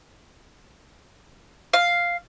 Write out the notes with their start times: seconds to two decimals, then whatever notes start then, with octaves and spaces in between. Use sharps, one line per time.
1.73 F5